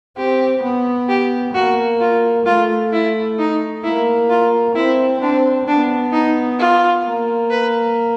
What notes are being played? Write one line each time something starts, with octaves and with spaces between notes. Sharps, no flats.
C4 G4
B3
G4
A#3 F#4
F4
A3 F4
E4
D#4
A#3 E4
F4
C4 E4
C4 D4
B3 D4
D#4
F4
A#3
B4